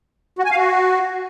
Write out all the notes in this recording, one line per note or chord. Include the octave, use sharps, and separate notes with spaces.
F#4
G#5
F5
F#4